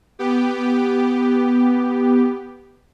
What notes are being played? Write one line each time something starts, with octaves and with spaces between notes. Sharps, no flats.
B3 G4